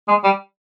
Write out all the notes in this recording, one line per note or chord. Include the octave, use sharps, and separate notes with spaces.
G#3
G3